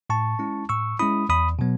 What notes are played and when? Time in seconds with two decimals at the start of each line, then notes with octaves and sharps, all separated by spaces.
0.10 A2 A5 C#6
0.39 G#3 C#4 E4
0.69 A2 C#6 E6
0.99 G#3 C#4 E4 B5 D#6
1.29 E2 B5 D#6
1.59 B2 F#3 B3